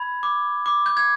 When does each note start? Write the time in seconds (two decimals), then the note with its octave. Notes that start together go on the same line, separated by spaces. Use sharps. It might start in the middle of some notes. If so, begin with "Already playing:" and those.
Already playing: B5 G#6
0.23 D6
0.66 D6
0.86 G6
0.97 G#6